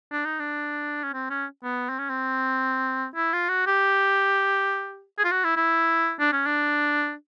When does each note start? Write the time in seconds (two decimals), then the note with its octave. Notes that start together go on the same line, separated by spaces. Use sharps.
0.12 D4
0.25 D#4
0.40 D4
1.04 C#4
1.14 C4
1.30 C#4
1.64 B3
1.89 C4
1.99 C#4
2.10 C4
3.15 E4
3.33 F4
3.49 F#4
3.67 G4
5.18 G#4
5.25 F4
5.32 F#4
5.44 E4
5.57 E4
6.20 D4
6.32 C#4
6.46 D4